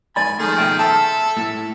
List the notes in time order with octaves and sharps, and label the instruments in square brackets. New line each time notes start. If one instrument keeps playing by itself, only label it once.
[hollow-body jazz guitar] G#2 D5 B5 [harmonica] G#5
[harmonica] D#3 F3 G#4 [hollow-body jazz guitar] A3
[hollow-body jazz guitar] B2 E5 G5
[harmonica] A4 E5 [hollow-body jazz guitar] A5
[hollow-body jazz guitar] A2